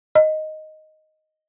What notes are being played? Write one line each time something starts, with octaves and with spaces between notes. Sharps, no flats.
D#5